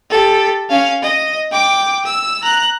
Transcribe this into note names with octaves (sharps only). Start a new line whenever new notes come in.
G4 A4
C#4 F5
D#5
G5 D6
E6
A#5 F#6